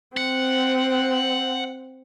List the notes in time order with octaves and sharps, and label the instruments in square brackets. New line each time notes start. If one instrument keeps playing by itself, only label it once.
[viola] C4 [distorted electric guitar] F#5